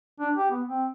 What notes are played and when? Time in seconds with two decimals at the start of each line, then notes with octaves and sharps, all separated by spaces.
0.20 D4
0.36 G4
0.51 B3
0.67 C4